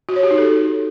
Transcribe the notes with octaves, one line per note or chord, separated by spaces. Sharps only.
F#4
C#5
G4
D#4
A4